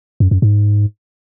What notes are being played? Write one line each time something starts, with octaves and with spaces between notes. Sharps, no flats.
F#2
F#2
G#2